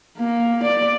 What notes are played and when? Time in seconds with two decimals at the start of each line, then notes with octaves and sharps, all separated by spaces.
0.18 A#3
0.63 D5